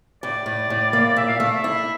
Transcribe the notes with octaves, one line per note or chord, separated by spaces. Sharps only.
A2 D5
A2
A2
A#3
A#2 E5
F5
A3 E5
E4